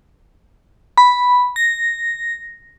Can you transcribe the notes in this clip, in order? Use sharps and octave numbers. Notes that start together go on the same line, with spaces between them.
B5
A#6